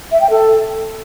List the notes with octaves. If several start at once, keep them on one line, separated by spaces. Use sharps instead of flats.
E5
G5
A4